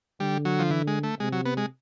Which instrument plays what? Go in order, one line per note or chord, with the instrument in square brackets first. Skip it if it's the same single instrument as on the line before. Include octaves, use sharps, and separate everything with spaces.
[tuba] D3 [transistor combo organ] G3
[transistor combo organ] F#3
F3
E3
G#3
A3
[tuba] C3 [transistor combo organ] G#3
[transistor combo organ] F#3
B3
G#3